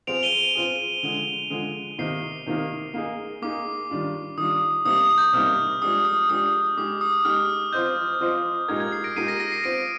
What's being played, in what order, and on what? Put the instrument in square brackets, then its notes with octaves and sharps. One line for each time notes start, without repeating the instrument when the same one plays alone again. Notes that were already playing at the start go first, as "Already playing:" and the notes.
[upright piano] F3 C4 F4 G#4 [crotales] D7 F7
[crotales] D#7 G7
[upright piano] F3 C4 F4 G#4
D3 F3 G#3
D3 F3 G#3
[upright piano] C3 D#3 A#3 D#4 [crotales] C7
[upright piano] C3 D#3 A#3 D#4
A#3 D#4 G#4
[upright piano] A#3 D#4 G#4 [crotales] D6
[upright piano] D#3 G3 D4 F4
[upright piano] D#3 G3 D4 F4 [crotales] D#6
[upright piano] C3 G3 A#3 D#4 [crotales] D#6
[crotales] D#6
G6
[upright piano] C3 G3 A#3 D#4 [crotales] F6
[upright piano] F3 G#3 D4 G4 [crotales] D#6
[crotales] D#6
[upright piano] F3 G#3 D4 G4 [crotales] D#6
[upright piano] G#3 D#4 G4 [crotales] D6
[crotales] D#6
[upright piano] G#3 D#4 G4 [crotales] F6
[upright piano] F3 C4 F4 C5 D#5 [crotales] G6
[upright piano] F3 C4 F4 C5 D#5
[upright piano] A#2 G#3 D#4 G4 A#4 [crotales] G#6
[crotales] G#6
C7
A#6 D7
[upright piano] A#2 G#3 D#4 G4 A#4 [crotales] C7 D#7
[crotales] A#6 D7
A#6
C7
[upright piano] C4 F4 C5 [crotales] A#6 D7